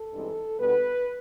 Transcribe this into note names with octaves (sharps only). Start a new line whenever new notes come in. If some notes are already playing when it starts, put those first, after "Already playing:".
Already playing: A4
G2 E3 G#3 C4 D#4
B2 G3 B3 D4 B4